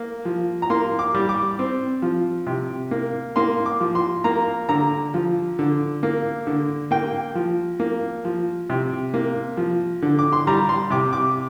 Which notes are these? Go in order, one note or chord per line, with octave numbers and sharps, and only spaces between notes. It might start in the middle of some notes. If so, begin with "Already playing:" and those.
Already playing: A#3
F3
A#5
A#3 C6
D6
G3
D6
C4
F3
C3
A#3
A#3 C6
D6
F3
C6
A#3 A#5
D3 A#5
F3
D3
A#3
D3
A#3 G5
F3
A#3
F3
C3
A#3
F3
D3
D6
C6
G3 A#5
C6
C3 D6
D6